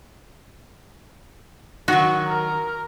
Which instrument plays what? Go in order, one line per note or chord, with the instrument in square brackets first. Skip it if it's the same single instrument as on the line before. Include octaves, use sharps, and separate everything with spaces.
[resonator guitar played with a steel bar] D#3 F#3 [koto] F#4
[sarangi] A#4